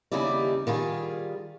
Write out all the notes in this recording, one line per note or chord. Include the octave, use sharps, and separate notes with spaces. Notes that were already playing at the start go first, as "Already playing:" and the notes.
D#2 C#3 G3 D#4 E4 D5
D#3 G3 F4 G#4